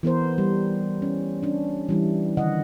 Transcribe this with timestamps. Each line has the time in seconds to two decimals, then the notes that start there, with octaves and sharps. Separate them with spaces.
0.03 E3 B3 A#4 C5
0.38 G3
1.02 C#4
1.43 C#4 D4
1.89 E3 G3 E4
2.37 D3 D#3 D#5 F#5